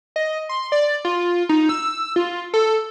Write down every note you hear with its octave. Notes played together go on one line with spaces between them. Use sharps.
D#5
C6
D5
F4
D#4
E6
F4
A4